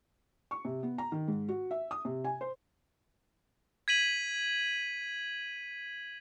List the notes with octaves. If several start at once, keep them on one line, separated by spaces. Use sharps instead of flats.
C#6
C3
B3
A#5
D#3
G#2
F#4
E5
D#6
C3
G#5
C5
G#6 B6 D#7 F#7